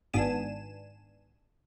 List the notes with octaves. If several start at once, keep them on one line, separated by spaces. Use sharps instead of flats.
G#1 G#2 B3 D4 G#5 E7